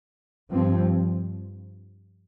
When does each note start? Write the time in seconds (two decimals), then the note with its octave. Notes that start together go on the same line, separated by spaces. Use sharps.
0.50 G2 F3 C4